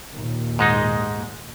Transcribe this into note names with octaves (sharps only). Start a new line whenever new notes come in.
D#2 A#2
G#2 G#3 D#4